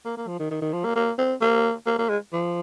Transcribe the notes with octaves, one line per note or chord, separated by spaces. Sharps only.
A#3
A#3
F3
D#3
D#3
D#3
F3
A#3
A#3
C4
A#3
A#3
A#3
G#3
F3